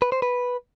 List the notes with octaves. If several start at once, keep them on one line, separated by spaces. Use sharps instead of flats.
B4
C5
B4